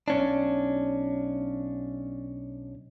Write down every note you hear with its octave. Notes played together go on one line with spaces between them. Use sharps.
B1 C#4 D4